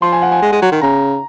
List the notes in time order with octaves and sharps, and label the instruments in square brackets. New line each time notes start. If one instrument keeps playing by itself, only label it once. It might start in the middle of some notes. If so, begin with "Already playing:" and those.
[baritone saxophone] F3 [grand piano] C6
[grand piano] G#5
F#5
G#5
[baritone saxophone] G#3
G#3
F#3
D#3
[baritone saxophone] C#3 [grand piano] A#5